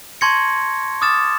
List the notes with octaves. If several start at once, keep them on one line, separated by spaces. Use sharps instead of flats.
A5 C6 C#6 G#6 A#6 C#7
D6 D#6 F6 A6 E7